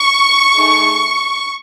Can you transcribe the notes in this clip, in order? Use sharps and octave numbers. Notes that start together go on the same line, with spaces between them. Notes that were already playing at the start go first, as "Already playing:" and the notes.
Already playing: C#6
A3 D#4 G#4